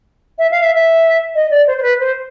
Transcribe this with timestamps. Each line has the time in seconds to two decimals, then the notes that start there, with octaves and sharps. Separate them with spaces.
0.39 E5
0.51 F5
0.63 E5
0.75 E5
1.35 D#5
1.51 D5
1.67 C5
1.78 C5
1.83 B4
2.00 C5